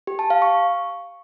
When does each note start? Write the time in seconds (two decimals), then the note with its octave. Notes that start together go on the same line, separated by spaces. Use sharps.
0.07 G4
0.19 A5
0.30 F5
0.42 C#6